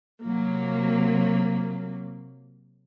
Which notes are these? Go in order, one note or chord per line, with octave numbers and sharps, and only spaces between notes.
C3 F#3 A#3